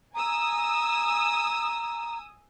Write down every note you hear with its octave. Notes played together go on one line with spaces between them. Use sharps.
G#5 A#5 D#6 E6